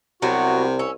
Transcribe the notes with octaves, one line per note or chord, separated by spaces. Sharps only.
C2 C3 F#3 B3 F#4
C#4 E6